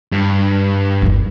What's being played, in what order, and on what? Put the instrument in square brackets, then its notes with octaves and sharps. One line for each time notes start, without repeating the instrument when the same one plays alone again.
[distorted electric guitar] G2
[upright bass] G1 D#2